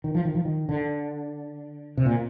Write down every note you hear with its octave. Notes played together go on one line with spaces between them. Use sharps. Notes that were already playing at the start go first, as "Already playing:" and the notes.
D#3
F3
D#3
F3
D#3
D3
C3
A#2